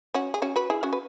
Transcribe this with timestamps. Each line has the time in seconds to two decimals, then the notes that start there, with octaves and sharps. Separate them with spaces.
0.14 C#4 F#4
0.34 G#4
0.42 C#4 F#4
0.56 F#4 B4
0.70 E4 G#4
0.83 C#4 F#4
0.93 B4